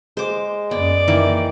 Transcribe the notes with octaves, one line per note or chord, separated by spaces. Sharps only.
G#3 C5 D6
F#2 B3 D5
D#3 E3 A#3